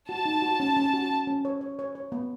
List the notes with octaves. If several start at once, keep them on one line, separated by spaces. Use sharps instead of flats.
F#4 A5
D#4
F#4
C#4
C#4
F#4
C#4
C#4
C#5
C#5
C#5
C#5
B3